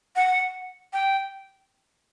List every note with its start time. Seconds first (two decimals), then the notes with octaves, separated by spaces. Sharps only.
0.16 F#5
0.93 G5